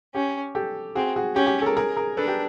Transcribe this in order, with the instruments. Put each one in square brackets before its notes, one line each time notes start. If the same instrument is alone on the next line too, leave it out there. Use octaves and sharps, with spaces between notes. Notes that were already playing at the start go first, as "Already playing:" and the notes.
[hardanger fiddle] C#4 [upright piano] G4
[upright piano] G4 A4
[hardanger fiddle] C4 [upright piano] F#4 G#4
[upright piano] F#4 G#4
[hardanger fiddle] C#4 [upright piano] G4
[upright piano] G4
A4
G#4 A#4
G#4 A#4
G#4 A#4
[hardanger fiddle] D4 [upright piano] A4 B4
[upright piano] G4 A4